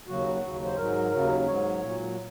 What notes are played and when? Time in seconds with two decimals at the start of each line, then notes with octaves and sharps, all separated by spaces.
0.07 D#2 C#3 F#3 F#4
0.42 D#2 C#3 F#3
0.65 C5
0.77 G#2 F#3 A#4
1.12 D#2 C#3 F#3
1.46 G#2 F#3 C#5
1.81 A#2 F#3